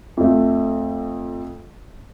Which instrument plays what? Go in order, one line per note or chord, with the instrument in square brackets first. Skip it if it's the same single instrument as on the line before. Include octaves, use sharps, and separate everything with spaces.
[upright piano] F2 A3